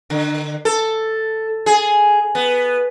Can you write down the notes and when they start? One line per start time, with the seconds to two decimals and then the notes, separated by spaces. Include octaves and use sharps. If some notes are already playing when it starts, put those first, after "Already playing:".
0.10 D3
0.65 A4
1.66 G#4
2.35 B3